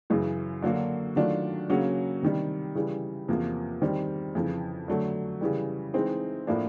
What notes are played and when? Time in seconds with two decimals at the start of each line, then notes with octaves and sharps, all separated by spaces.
0.10 F#2 C#3 E3
0.62 D3 F#3 A#3 D4 F#4
1.16 D#3 F#3 A3 D4 F4
1.70 C#3 F#3 A#3 C#4 F#4
2.22 C3 D#3 G3
2.75 C#3 E3 G3
3.28 E2 C3 F3 A#3
3.82 D#3 G3 C4
4.35 F2 C#3 E3
4.88 D3 F#3 A3
5.41 C#3 E3 G3
5.94 E3 G#3 C4 D#4
6.47 A2 F3 A#3 D4